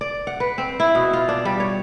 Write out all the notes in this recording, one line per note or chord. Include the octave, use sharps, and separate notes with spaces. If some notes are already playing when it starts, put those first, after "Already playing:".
D5
F#5
B4
C4
E4
B2
F4
D4
G3
C#5